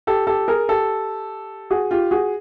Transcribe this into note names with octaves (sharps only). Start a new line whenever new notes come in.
G4 A4
G4 A4
G#4 A#4
G4 A4
F#4 G#4
F4 G4
F#4 G#4